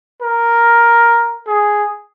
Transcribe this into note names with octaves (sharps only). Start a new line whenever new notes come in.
A#4
G#4